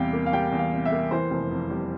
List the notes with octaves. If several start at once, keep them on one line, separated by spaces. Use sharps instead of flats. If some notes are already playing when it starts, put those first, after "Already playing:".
Already playing: E2 C3 G3 F5 G5
A#3
F5
G3 G5
E2
F5
C3
E5
A#3
E3 C5
F1
F2
G3